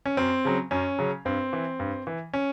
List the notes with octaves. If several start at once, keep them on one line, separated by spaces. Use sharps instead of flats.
C#4
F#2 C4
C#3 F#3
F#2 C#4
C#3 F#3
G2 C4
E3
G2
E3
C#4